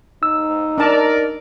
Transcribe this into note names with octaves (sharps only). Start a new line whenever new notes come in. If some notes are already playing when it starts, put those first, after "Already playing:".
D#4 E6
D4 A#4 D5 A5